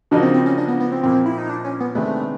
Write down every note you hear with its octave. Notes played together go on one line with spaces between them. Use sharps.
C#3 F3 A#3 D4 D#4 F#4
C4
C4
C#4
D4
B3
B3
C4
A#2 F3 A#3 C4
E4
D#4
D4
C#4
B3
C3 D#3 G#3 A3 B3 D4